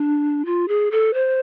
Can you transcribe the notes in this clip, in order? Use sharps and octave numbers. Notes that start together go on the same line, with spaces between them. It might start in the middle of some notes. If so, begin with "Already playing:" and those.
Already playing: D4
F4
G#4
A4
C5